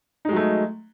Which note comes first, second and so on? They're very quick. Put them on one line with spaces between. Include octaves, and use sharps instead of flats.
D#4 G#3 F#3 A3